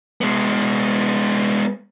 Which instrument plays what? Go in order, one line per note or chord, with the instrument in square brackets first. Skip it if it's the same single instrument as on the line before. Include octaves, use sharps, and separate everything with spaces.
[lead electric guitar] G#3 B3